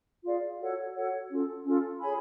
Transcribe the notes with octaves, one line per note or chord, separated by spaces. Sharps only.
F4 G#4 D5 F5
F#4 A4 C#5 F#5
F#4 A4 C#5 F#5
C#4 F4 A4
C#4 F4 A4
G#4 C#5 G#5 B5